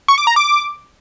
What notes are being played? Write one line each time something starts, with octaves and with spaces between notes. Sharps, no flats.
C#6
D6
A#5
D6